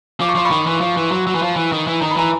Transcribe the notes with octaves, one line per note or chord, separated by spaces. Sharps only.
F3 D6
C#6
F3 C6
B5 C#6
D#3
E3
F3
E3
F#3
F#3
E3
F3
E3
D#3
E3
D#3 A#5
B5
E3 G#5 A#5